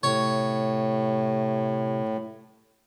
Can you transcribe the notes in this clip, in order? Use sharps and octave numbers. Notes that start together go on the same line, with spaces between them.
A2 C3 C#5